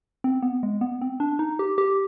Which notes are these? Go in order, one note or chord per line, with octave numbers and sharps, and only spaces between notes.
C4
B3
G#3
B3
C4
D4
D#4
G4
G4